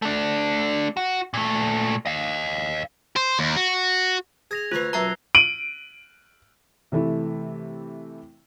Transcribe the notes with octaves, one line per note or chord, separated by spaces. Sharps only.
A3 D4
F#4
A#2 A3
D#5 F5
C5
D#2
F#4
G#4 G#6 A#6 F7
D2 A3 F4 B4 B5 F#6
F#2 B2 E5 A5 A#5 E6 C7 G7
D7 D#7 F#7
C3 E3 A3 E4